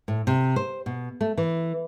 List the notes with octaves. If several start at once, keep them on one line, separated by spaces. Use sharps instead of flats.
A2
C3
C5
B2
A3
E3